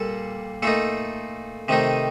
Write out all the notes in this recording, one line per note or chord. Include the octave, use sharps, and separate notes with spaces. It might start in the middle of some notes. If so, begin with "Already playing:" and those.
Already playing: A#2 G3 A#3 A4
A#2 A3 D#4 A4
C3 D#3 A3 D#4